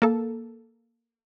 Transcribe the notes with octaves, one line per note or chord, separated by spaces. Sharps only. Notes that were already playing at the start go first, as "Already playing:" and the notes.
A#3 A4